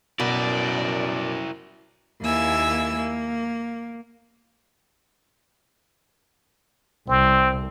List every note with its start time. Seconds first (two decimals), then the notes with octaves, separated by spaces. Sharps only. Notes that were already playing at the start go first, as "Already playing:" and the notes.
0.20 F#2 B2 E4 A#4 D5
2.21 D#2 A#3 E4 G#5 E6
2.96 A#3
7.08 C2 C4